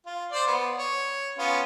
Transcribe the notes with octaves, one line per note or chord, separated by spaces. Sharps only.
F4
C5 D5
B3
C#5
B3 C#4 F4